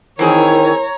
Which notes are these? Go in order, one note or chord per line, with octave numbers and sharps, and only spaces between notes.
D#3 E3 C4 E4 G#4 A#4 C#5 A#5